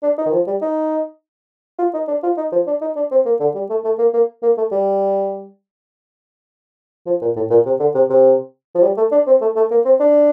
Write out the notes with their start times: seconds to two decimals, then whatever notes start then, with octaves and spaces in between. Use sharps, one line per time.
0.03 D4
0.18 D#4
0.26 D#3
0.32 F3
0.47 G3
0.62 D#4
1.79 F4
1.94 D#4
2.08 D4
2.23 F4
2.37 D#4
2.52 F3
2.67 D4
2.82 D#4
2.96 D4
3.11 C4
3.26 A#3
3.40 D3
3.55 G3
3.70 A3
3.84 A3
3.98 A#3
4.14 A#3
4.43 A#3
4.57 A3
4.72 G3
7.06 F3
7.22 A#2
7.36 A2
7.50 A#2
7.66 C3
7.80 D3
7.95 C3
8.10 C3
8.75 F3
8.83 G3
8.97 A3
9.12 D4
9.27 C4
9.41 A3
9.56 A3
9.71 A#3
9.85 C4
10.00 D4